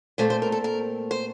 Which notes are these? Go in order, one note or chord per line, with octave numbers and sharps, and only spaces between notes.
A#2 A3 C4 C5
C5
A#4
A4
A#4
C5